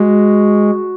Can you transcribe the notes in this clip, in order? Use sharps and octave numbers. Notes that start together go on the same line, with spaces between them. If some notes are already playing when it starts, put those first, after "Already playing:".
Already playing: G#3 F#4